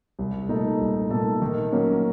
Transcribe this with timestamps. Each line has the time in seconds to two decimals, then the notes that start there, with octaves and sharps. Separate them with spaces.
0.19 C2
0.49 A#2 A3 D#4 A4
0.81 C2
1.10 A#2 A3 D#4 A4
1.42 D#3
1.72 F#3 A#3 C#4 F#4